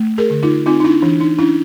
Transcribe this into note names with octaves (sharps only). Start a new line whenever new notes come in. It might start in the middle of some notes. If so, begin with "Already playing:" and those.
Already playing: A3
G#4 A#4
D3
D#4 F4
C4 D#4 F4
D#4
D4 E4
E3 D4
D#4
C#4 D4 E4